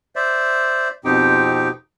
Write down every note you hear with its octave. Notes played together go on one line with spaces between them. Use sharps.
C5 D5 E5
F2 B2 C4 D#4 G4 G5